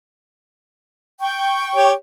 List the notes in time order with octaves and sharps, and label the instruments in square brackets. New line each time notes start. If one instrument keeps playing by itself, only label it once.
[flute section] G5 C#6
[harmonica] G4 C#5